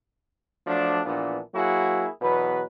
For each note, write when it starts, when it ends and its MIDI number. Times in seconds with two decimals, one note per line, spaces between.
0.67 1.01 53
0.67 1.01 54
0.67 1.01 57
0.67 1.01 62
1.05 1.39 34
1.05 1.39 46
1.05 1.39 52
1.05 1.39 59
1.05 1.39 62
1.54 2.07 54
1.54 2.07 58
1.54 2.07 64
1.54 2.07 66
1.54 2.07 68
2.22 2.63 40
2.22 2.63 47
2.22 2.63 54
2.22 2.63 71